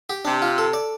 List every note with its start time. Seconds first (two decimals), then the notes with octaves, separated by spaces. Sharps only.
0.10 G4
0.25 C3 D4
0.42 F4
0.58 A4
0.73 D5